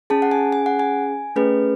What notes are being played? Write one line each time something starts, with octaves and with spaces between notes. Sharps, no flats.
C#4 G#4 A5
F#5
G#5
G#5
F#5
G#5
A3 C#4 G#4 B4